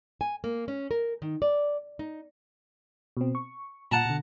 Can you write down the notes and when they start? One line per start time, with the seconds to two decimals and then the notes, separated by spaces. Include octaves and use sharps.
0.21 G#5
0.44 A#3
0.68 C#4
0.91 A#4
1.22 D#3
1.42 D5
1.99 D#4
3.17 B2 C4
3.35 C#6
3.91 A#2 F#5 A5 A#5
4.05 B2 D3